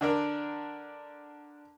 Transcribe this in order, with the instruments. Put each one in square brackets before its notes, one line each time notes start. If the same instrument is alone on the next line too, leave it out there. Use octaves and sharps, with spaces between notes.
[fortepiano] D3 D4 A#4